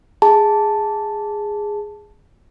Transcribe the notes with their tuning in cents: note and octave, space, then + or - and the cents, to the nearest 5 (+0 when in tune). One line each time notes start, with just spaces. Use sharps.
G#4 -5 A5 +0